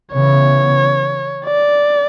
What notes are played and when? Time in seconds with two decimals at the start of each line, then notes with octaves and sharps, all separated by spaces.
0.13 C#3 E3 B3 C#5
1.45 D5